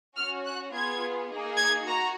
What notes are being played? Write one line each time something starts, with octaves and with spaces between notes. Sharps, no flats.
C#4 F#4 F6
F#6
B3 F4 G#4 G#6
A#3 D#4 G#4
G#6
F#4 A#5